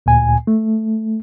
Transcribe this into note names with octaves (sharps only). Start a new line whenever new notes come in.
D2 A#2 G#5
A3